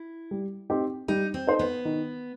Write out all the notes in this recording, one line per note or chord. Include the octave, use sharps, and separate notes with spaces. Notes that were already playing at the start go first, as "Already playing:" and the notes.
Already playing: E4
G3
C4 D#4 G4
G3 D#4
C4
D#4 A4 C5 D#5
B3
D#3